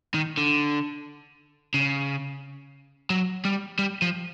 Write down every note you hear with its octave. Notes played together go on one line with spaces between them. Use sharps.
D#3
D3
C#3
F#3
G3
G3
F3